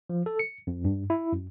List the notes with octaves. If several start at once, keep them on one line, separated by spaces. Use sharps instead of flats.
F3
A4
C#7
F2
G2
E4
F#2